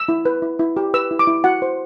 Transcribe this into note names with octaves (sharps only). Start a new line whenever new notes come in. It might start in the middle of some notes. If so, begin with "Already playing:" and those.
Already playing: E6
E4
B4
E4
E4
G4
B4 E6
E4
D6
E4
F#4 F#5
C5